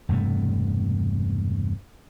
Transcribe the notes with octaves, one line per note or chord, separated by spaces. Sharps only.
E1 G2 C3 A3